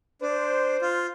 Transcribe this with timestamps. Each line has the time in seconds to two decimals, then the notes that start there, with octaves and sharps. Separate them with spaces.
0.22 D4 C5
0.81 F4